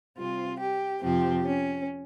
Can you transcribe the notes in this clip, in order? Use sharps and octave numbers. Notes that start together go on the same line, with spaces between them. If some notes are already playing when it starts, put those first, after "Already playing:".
C3 G3 C4 F4
G4
F2 C3 F3 C4 G4
C#4